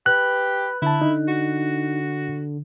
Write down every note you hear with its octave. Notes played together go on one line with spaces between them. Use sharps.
G4 B4 F#6
D3 E4 A5
D3 D#4
F#4